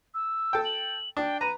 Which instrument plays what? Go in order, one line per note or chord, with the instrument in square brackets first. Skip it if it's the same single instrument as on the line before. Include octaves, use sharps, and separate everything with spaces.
[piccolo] E6
[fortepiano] A4 G5
[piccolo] F#7
[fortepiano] D4 [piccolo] G5
[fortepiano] B4 A#5 [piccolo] D#7